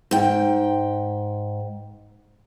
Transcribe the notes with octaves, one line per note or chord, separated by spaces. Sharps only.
G#2 G5